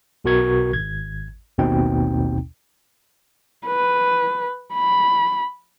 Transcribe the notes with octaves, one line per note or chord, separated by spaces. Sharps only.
B1 B2 F#4 A#4 C#6 G#6
G#1 G#6
A1 D#2 B2 C4 D#4 G5
B4
B5